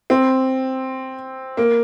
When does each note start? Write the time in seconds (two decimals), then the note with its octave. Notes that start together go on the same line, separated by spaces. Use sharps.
0.10 C4
1.57 A#3